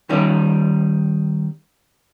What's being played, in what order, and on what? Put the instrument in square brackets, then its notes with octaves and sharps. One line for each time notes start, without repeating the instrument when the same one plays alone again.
[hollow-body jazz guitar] D#3 G3 C#4 D#4